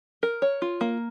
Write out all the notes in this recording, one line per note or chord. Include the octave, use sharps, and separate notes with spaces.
A#4
C#5
F4
A#3